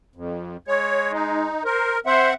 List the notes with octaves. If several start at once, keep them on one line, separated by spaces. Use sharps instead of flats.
F2
G#3 C#5
D#4
A#4 C5
C4 C5 E5 F#5